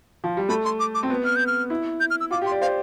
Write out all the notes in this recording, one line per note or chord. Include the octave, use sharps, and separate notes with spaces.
F3
G3
A3 B5
C6
D6
D6
C4
B3
F6
G6
F6
E4
G6
F6
E6
F4 D6
G4
C6
D5
C5 F5